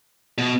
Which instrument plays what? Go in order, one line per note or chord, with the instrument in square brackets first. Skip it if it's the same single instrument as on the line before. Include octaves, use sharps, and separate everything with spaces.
[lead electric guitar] B2